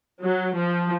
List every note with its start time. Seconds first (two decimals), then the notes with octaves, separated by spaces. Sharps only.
0.22 F#3
0.55 F3